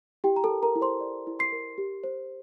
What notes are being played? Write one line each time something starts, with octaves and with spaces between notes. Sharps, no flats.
E4 G4 G5
A#5
A4 A5
A#4
A#4 A#5
E4
C5 C6
D5
E4
C6 C7
A#4
G4
C5